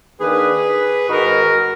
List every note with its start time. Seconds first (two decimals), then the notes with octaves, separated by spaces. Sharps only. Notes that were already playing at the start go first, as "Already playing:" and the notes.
0.20 D#3 A#3 D4 G#4 B4
1.09 G#2 D#3 G#3 D#4 F#4 A#4